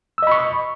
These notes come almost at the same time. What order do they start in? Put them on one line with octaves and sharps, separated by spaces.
E6 D#5 B5 C#6